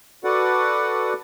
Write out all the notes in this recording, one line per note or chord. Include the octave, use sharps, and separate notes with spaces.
F#4 A4 B4 D5 F#5